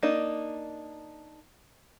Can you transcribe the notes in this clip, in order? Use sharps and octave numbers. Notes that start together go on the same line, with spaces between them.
A#3 D4 D#4